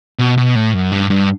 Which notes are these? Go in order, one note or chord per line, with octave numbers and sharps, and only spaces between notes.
B2
B2
A2
F#2
G2
G2